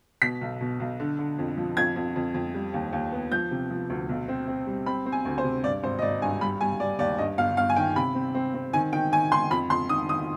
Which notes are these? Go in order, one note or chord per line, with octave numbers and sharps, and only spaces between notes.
B2 B6
B1
B2
B1
D3
D3
F2
F3
F2 G#6
F2
F2
F2
G3
D#2
D#2
B3
F3 G6
C3
F3
D2
B1
C4
C4
G3
C4 B5
C4
G#5
D2
C5
C3
G2 D5
G#1 C5
D#5
G#1 D5
G2 G#5
G3 B5
G3 G#5
G3 D5
D#2 D5
G2 D#5
G1 F5
G1 F5
G#5
D#3 G5
C3 B5
C4
C4
C4
D#3 G#5
D#3 G5
D#3 G#5
D#3 C6
F2 B5
F2 C6
D#3 D#6
D#3 D#6